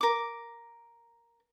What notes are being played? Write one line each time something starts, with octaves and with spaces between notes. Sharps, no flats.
A#4 D6